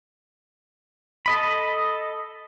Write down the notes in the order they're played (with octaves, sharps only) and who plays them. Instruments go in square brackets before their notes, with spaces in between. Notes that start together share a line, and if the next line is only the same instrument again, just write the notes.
[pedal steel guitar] A4 D#5 B5